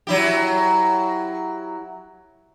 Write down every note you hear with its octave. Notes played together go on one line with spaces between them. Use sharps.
F#3 E4 G4